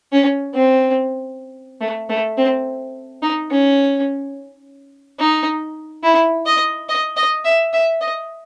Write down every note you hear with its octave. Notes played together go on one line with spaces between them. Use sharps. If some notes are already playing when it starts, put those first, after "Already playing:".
C#4
C4
A3
A3
C4
D#4
C#4
D#4
E4
D#5
D#5
D#5
E5
E5
D#5